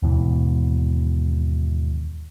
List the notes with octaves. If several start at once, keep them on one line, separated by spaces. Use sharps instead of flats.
D#2 G#2 B2 E3